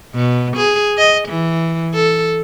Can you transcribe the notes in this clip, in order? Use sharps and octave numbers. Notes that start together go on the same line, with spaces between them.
B2
G#4
D#5
E3
A4